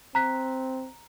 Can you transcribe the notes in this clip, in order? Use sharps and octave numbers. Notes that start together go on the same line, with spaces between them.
C4 A#5 F#6 B6